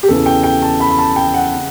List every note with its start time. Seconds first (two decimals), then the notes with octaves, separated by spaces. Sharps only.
0.03 G4
0.08 E2 C#3 E3 A4
0.26 G5
0.43 G5
0.62 A5
0.80 B5
0.90 B5
0.99 A5
1.16 G5
1.34 F#5
1.54 C#3